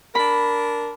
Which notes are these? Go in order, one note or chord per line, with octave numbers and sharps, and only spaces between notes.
D4 A#4 B5